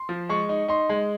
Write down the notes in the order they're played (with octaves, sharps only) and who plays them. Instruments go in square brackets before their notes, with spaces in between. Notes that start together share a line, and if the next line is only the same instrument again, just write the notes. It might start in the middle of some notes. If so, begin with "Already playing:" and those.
Already playing: [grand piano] C6
F3
G#3 C#6
D#4
D#4 C6
G#3